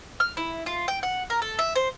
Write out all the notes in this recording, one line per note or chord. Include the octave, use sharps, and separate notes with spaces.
F6
E4
F4
G5
F#5
A#4
A4
E5
C5